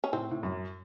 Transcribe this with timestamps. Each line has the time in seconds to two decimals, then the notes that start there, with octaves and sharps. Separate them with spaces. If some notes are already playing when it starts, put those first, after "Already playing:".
0.04 C#4
0.13 A2 C4
0.31 A2
0.43 F#2